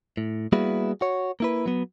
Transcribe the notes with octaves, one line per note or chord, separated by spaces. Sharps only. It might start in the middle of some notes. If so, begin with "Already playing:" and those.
A2
G3 A#3 B3 E4 F#4 G#4
F#4 C#5
A#3 E4 B4
F#3 B3